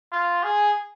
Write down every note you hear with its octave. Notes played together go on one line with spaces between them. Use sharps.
F4
G#4